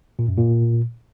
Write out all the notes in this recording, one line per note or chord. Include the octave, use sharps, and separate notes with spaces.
A#2
F#2
A#2